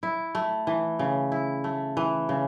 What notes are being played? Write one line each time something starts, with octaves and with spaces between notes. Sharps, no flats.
E4
A3
E3
C#3
E4
A3
E3
C#3